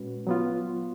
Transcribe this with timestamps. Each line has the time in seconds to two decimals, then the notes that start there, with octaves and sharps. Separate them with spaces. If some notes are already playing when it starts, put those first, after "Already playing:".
Already playing: A#2 G#3 C#4 F#4 B4
0.27 F#3 B3 F4